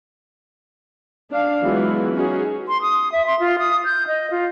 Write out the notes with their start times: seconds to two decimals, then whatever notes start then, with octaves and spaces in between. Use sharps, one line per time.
1.31 D4 F5
1.62 E3 F#3 G#3 B3 F4 F#4
2.14 C#4 D#4 F#4 G#4
2.68 C6
2.82 D#6
3.12 E5
3.27 C6
3.40 F4
3.59 D#6
3.85 G6
4.07 D#5
4.31 F4